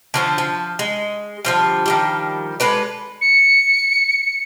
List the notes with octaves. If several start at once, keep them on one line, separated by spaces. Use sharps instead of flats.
D3 F3 C#4
F3
G#3
D3 F3 G3
D#3 F3 G3
G#3 A4 B4 D5
C#7